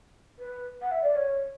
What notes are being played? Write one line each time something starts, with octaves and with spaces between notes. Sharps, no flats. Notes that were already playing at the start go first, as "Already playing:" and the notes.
B4
F#5
E5
D5
C#5